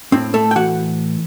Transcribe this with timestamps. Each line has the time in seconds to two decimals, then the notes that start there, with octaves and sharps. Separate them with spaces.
0.12 A2 C4
0.34 A3 A4
0.51 G5
0.56 E3 F#4 F#5